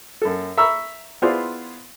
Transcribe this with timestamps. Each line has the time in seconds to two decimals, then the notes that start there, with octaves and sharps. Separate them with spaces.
0.22 F#2 A4
0.57 E5 A#5 B5 C#6 E6
1.22 B3 E4 F4 G#4 C5 D5